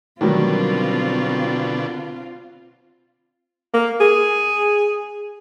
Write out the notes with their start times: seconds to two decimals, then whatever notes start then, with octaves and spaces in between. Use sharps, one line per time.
0.21 B2 D3 D#3 F#3 G3 C4 F4
3.74 A#3
4.01 G#4